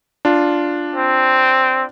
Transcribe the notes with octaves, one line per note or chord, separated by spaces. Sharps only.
D4 F4
C4